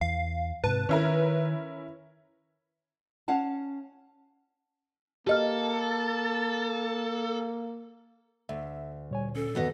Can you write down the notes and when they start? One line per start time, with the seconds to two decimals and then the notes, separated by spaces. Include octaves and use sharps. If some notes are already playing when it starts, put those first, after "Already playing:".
0.01 E2 F5
0.64 G#2 C3 B4 A5
0.89 D#3 C#4 E4 A#4
3.28 C#4 F5 F#5 A5
5.27 A#3 G4 A4 D#5 F6
8.49 D2 E5
9.11 A#2 G3 C#5 G#5
9.36 C#4 A4
9.55 E2 D#3 B3 F#4 D#5 F#5